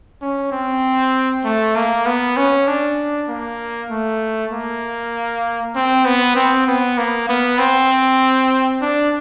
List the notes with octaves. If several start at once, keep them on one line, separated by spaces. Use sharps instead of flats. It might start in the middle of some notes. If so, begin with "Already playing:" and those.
C#4
C4
A3
A#3
B3
C#4
D4
A#3
A3
A#3
C4
B3
C4
B3
A#3
B3
C4
D4